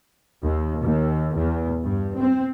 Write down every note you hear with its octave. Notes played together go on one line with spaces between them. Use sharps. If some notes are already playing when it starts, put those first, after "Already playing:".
D#2
D#2
E2
G2
C4